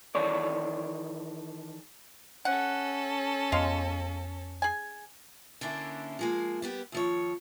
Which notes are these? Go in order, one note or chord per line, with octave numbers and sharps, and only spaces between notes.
D#3 E3 A4 C#5 D5
C#4 A4 F#5
F2 G#3 B3 F4
G#4 G#5
D3 A#3 C#4 D4 E4
F3 G#3 A#3
G3 B3 G4
D#2 F3 C#5